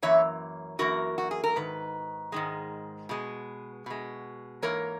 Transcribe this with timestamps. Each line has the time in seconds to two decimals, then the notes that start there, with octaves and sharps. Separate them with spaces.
0.02 F#2 E3 A#3 C#5 E5
0.79 F#2 E3 A#3 F#4 A#4
1.18 F#4
1.31 G#4
1.44 A#4
1.56 G#2 D#3 B4
2.32 G#2 D#3 G#3
3.09 B2 G#3
3.86 B2 G#3
4.62 G#2 E3 A#3 A#4 C#5